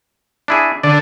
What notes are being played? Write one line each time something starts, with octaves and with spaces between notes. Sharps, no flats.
D4 E4 G#4
D3 D5